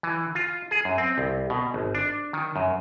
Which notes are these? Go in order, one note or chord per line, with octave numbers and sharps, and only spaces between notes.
E3
F4
G#4
F#2
C4
C2
B2
G#1
D4
D#3
F#2